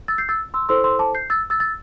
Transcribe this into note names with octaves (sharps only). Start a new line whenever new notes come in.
E6 A6
G6 C7
E6 A6
C6 E6
E4 A4 C5 C6 E6
C6 E6
A5 D6
G6 C7
E6 A6
E6 A6
E6 A6